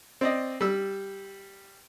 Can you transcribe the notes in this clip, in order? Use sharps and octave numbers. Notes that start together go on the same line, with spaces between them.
C4 D5 D#5
G3 E6